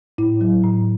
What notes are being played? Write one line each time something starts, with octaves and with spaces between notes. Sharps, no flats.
A2 E4
F#3
A2